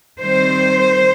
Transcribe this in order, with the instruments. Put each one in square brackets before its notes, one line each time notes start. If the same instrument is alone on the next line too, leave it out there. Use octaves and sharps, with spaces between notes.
[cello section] D#3 G3 C4 C5